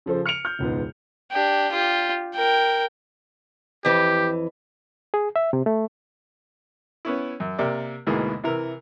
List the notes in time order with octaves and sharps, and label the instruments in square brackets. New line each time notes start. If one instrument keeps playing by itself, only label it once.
[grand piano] C#3 F3 A4 C5
F6 C#7 D7 F7
F6 G6
E1 C#2 G#2 B3
[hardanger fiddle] D4 G4
F4 G4
A#4 G5
[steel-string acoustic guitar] F2 E3 [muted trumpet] G4
[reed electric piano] G#4
E5
C3
A3
[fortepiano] B3 C#4 E4
F#2
C3 A#3 G4 D5
D2 G#2 B2 E3 G#3 A#3
C3 E3 A#4